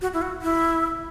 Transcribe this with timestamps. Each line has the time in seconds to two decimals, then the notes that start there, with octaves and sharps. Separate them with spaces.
0.01 F#4
0.14 E4
0.22 F#4
0.42 E4